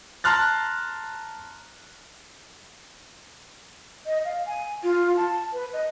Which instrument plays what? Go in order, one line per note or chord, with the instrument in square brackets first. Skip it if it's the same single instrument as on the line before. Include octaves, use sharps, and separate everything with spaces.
[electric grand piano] A5 A#5 C6 F6 F#6 A6
[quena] D#5
F5
G#5
F4
A5
B4
D#5